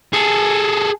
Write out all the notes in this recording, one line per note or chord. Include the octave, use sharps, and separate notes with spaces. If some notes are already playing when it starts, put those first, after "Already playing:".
G#4 A4